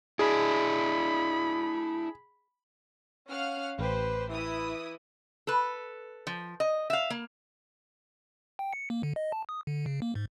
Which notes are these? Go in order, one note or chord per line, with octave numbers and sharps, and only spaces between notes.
D4 E4 G#4 B5
C#4 F5 F#5 F6
A1 G4 B4 C5
E3 E4 D#6
A4 B4
F3
D#5
E5 F5
A#3
G5
C#7
A#3
D3
D#5
A5
D#6
D3
C#3
A#3
G#2